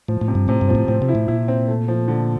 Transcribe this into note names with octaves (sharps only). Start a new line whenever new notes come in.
A2 F3
A2
C3
G2
A2 C3
G2
A#2 F3
A2
A2 C4
C3
E4
A2
A#2 E4
C4
A3
F3
D3